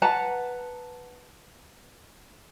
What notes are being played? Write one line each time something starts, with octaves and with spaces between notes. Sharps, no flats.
B4 F#5 A5 A#5